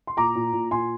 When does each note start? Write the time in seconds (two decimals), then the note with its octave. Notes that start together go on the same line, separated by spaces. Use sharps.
0.07 C6
0.17 A#2 A#5 D6
0.35 A#2
0.53 A#2
0.71 A#2 G#5 C6